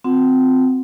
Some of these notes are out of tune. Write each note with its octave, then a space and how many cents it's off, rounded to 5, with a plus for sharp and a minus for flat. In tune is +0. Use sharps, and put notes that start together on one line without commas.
C4 -15 F4 +40 F#5 +0